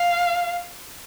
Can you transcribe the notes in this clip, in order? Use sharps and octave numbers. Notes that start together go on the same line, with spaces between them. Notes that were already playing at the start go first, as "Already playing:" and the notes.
Already playing: F5